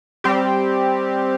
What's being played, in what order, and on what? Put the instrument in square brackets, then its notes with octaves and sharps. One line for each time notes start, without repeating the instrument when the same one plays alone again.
[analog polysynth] G3 C4 G4